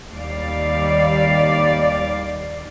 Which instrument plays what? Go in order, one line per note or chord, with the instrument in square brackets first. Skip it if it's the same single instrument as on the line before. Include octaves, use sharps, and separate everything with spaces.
[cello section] D#2 G3 D5 F5